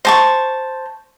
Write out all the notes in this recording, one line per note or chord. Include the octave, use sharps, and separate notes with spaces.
C5 A5 C#6